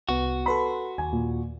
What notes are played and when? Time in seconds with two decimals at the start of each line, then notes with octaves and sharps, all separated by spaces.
0.09 C2 B3 F#4
0.46 A4 B4 B5 C6
0.98 D#2 G#5
1.13 A#2